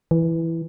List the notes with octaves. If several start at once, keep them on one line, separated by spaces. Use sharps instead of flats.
E3